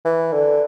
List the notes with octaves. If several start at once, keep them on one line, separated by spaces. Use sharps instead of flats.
E3
D3